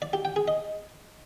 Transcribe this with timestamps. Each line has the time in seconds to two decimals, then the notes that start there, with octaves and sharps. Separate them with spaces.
0.02 D5
0.13 G4
0.25 G5
0.36 G#4
0.48 D#5